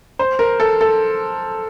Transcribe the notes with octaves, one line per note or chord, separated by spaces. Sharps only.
C5
A#4
A4
A4